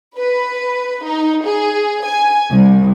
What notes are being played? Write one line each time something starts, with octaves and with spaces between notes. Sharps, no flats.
B4
D#4
G#4
G#5
C2